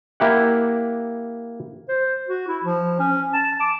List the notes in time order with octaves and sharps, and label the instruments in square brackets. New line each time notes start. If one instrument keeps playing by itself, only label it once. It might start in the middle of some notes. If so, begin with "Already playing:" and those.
[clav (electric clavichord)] A#3 E4 G4 F#5
[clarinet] C5
F#4
E4
F3
C#4
A5
D6